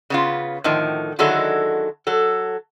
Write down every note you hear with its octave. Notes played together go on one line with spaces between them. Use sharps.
C#3 B3 F4
A2 D3 D#3 F3
D3 D#3 F#3 G#3 E4 A4
F#3 A4